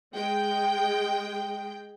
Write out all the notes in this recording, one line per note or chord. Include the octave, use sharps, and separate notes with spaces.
G#3 G5